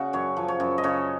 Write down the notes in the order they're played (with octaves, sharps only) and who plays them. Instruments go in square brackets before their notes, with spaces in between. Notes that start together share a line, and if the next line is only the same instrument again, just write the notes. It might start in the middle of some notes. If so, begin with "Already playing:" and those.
Already playing: [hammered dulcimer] C#3 F#4
F#2 C#5
F3
C#5
F#2
D#5
C#3 C#5